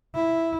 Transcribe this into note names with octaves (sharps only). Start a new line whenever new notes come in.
E4